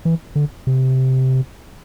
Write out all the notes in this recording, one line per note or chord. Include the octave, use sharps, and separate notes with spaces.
E3
D3
C3